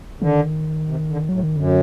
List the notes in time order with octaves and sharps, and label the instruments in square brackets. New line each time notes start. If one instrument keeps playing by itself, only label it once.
[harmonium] D3 [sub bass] D#3
[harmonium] C3
D3
[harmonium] A2 [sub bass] F#3
[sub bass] D#3
[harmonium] F#2 [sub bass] D3